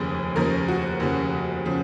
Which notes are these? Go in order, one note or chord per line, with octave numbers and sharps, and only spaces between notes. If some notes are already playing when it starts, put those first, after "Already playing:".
Already playing: F1 D#2 C#3 F3 G#4
F1 D#2 C#3 F3 A#4
F#4
F1 D#2 C#3 F3
C#3 F3